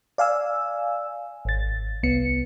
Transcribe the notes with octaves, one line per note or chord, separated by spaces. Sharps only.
D5 F5 G#5 E6
G#1 A6
C2 B3 C#7